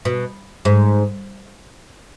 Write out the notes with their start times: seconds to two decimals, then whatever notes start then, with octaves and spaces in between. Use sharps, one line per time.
0.05 B2
0.65 G#2